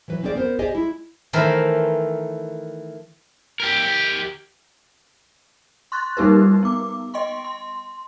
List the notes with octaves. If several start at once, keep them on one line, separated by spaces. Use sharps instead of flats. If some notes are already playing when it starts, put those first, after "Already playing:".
E3 F#3 B4
A#3 C4 C#4 G#4 D5
B3 A#4 C5
G4 G#4 C5 D5 D#5 G#5
G#3 E4
D#3 E3 A3 A#4 C5
G4 A#4
C6 C#6 F#6 A6
G3 A#3 D#4 G4 A#4 B4
B3 D6
D#5 G5 C6 C#6
C6